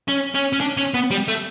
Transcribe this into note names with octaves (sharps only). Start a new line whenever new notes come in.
C#4
C#4
C#4
D4
C#4
B3
G3
A3